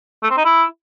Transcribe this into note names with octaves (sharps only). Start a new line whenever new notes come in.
A3
C4
D#4
E4